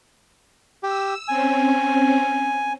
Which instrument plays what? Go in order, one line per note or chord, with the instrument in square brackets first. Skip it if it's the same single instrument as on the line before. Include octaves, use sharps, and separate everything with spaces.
[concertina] G4 [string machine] E6
[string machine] C4 C#4 [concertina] G#5